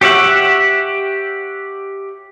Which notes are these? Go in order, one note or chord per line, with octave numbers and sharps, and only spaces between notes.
G4 C#5 E5 F#5